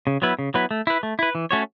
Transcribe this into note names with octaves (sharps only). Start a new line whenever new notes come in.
C#3
F#3 B3 E4 B4
C#3
F#3 B3 E4 B4
A3
E4 B4
A3
E4 B4
E3
A3 C#4 F#4 C#5